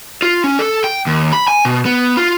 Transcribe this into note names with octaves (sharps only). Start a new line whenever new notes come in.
F4
C#4
A4
G5
D#2
B5
G#5
B2
B3
F4